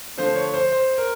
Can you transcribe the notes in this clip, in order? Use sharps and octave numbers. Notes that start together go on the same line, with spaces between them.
D3 F3 A3 C5
C#5
C5
C5
A#4